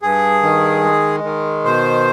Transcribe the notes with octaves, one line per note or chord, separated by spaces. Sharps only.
G2 G#4
D#3
G#3
D#3
B2 C5